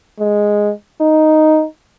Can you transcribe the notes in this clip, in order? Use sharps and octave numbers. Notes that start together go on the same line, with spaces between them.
G#3
D#4